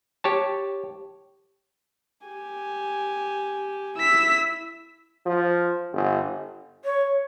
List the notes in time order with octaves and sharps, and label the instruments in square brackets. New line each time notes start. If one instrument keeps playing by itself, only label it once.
[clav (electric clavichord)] G4 C#5 A5
[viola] G4 G#5
[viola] E4 [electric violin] E6 B6
[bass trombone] F3
G1
[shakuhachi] C#5